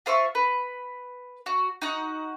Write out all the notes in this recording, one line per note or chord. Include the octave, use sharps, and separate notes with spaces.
F4 C5 E5 C#6
B4
F#4
D#4 F#4 F#5